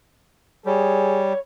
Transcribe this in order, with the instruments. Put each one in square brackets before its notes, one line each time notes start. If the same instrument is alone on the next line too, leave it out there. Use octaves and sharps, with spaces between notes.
[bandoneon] G3 [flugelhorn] G#4 [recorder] C#5